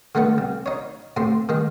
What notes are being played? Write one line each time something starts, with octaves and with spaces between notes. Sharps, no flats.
D3 G#3 A3 B3
C2
D#4 C#5
A2 C3 C6
D#3 G#3